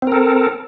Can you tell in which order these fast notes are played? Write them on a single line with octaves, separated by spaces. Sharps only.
C4 A#4 A4